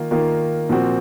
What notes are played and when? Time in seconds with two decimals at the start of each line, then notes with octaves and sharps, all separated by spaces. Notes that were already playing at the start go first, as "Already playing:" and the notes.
Already playing: D#3 A#3 F4
0.11 D#3 A#3 F4
0.69 A#2 F3 C4 F#4